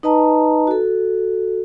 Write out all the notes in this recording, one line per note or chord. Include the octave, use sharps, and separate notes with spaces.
D#4 B4 D#5 A5 A#5
F#4 A4